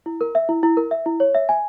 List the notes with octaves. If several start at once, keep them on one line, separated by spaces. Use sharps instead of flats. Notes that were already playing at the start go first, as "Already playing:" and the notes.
E4
A#4
E5
E4
E4
A#4
E5
E4
C#5
E5
G#5